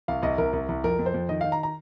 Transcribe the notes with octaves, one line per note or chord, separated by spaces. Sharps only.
C2 F5
C2 D#5
C2 A#4
C2
C2
F2 A#4
F2
C5
F2
D#3 D#5
D#3 F5
A#5
A#5